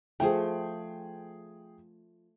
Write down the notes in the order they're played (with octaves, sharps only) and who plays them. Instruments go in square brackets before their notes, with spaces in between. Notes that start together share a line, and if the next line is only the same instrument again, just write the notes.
[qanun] F3 A3 [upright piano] G#4 G5